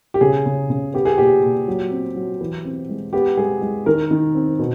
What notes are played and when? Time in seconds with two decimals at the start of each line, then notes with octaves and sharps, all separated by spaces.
0.14 G4
0.21 C#3 G#4
0.46 C#3
0.70 C#3
0.94 B3 G4
1.05 G#4
1.18 A#2 G4
1.43 A#2
1.68 F#3
1.91 C4
2.16 F#3
2.41 E3
2.65 C4
2.89 G#3
3.13 B3 G4
3.37 G#3 G#4
3.61 G#3
3.86 D#3 A#4
4.11 D#3
4.35 C4
4.59 B2